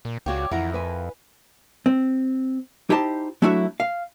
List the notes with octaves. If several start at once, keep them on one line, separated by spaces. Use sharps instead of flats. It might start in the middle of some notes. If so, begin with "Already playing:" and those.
A#2
C#2 F#4 G4 C#5 D5 F5 G5
F2 E3 E4 A#4 F#5 A#5
B4 G#5
C4
D#4 E4 G4 C5 A5
F#3 A3 D4 E4 F#4 E5
F5